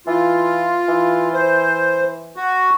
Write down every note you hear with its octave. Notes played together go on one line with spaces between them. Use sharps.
E3 F4
E3
C5
F#4